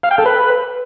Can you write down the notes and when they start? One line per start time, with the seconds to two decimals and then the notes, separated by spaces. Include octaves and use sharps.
0.03 F5
0.11 G5
0.18 A4
0.26 B4